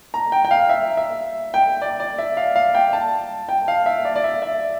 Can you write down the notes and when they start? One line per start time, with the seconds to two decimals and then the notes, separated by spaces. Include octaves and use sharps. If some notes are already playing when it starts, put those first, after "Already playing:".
0.14 A#5
0.32 G5
0.45 G5
0.51 F5
0.69 E5
0.97 E5
1.54 G5
1.82 D5
2.00 D5
2.18 E5
2.37 F5
2.56 F5
2.75 G5
2.93 A5
3.49 G5
3.68 F5
3.86 E5
4.05 D5
4.16 D5
4.24 E5
4.42 E5